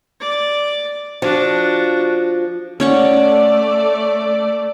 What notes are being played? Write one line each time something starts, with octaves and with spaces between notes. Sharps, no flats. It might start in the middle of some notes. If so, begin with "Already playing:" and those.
D5
F3 D4 F#4
A3 C#4 C#5 D5 F#5